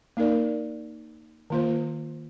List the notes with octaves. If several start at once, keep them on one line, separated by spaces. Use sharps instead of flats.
A#3 D#4 A#4 D5
D#3 A#3 F4 C5